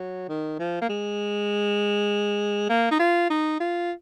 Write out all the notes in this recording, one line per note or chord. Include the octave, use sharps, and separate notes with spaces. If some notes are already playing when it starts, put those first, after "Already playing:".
Already playing: F#3
D#3
F3
A#3
G#3
A#3
D#4
F4
D#4
F4